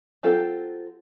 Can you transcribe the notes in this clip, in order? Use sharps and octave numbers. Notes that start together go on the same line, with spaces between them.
F#3 C4 F4 G4 A4